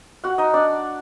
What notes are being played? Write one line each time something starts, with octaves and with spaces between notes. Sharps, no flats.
F#4 F#5
D#4 D#5
D4 D5